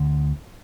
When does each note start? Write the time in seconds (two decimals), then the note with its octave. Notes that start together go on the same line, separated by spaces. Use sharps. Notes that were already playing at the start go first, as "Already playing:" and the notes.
Already playing: D2 D3